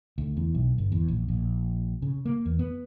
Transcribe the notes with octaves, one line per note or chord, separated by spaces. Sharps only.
D2
E2
B1
G1
E2
A#1
A#1
C#3
A#3
E2
B3